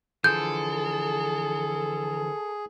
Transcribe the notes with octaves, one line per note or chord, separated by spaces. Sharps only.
D3 E3 F3 G#4 A4 G6